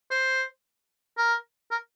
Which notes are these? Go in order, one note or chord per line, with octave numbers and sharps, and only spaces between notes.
C5
A#4
A#4